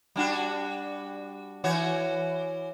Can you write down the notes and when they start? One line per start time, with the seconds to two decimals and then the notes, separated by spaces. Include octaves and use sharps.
0.16 G3 D4 F#4
1.64 E3 F#4 C#5